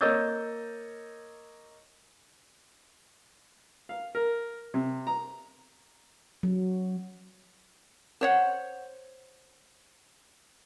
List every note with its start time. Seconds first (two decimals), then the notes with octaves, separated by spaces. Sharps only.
0.01 A#3 C#5 D#5 E6 G6 A6
3.89 F5
4.15 A#4
4.74 C3
5.07 A#5
6.43 F#3
8.21 C5 C#5 F#5